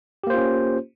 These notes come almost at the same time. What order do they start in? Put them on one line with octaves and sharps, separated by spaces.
G4 A#3 C5 F4 C#4